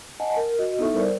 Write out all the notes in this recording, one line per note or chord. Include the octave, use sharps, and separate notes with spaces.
D#5 F#5 G#5 A5
A#4
F#4 D#5
B3 D#4 E4 A4 E5 C#6
G3 A#4 C5 D5